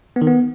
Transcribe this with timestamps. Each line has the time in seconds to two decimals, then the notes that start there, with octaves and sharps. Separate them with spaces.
0.16 B3
0.22 D#3
0.27 B3